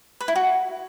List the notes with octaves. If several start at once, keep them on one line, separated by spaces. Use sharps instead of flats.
B4
E4
F#4